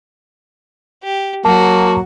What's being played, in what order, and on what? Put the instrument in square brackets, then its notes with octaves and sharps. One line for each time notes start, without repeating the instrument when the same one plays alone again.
[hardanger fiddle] G4
[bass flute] F#3 [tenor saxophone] A#3 [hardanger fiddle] F#4 [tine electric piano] A5